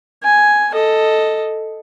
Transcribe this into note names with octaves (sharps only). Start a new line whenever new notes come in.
G#5
A4 D#5